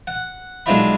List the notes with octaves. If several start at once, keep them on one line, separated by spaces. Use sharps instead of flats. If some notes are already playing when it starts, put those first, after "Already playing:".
F#5
B1 G#3 D4 F4 E5 B5